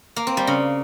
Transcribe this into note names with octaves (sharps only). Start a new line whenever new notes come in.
A#3
C4
G3
C#3